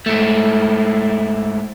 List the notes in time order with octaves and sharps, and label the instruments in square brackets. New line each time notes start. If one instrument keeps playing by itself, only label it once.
[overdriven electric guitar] G#2 A3